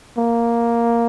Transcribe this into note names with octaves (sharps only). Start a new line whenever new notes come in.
A#3